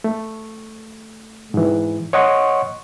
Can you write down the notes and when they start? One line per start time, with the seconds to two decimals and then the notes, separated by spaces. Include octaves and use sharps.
0.04 A3
1.54 G#2 E3
2.13 C#5 D#5 F#5 C6 C#6